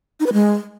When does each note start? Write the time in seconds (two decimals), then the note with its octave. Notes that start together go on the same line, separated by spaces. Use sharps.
0.20 D#4
0.26 B4
0.33 G#3